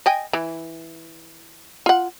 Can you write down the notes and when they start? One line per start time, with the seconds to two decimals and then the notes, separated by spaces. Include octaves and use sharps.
0.06 D#5 G5 G#5
0.33 E3
1.86 F4 F#5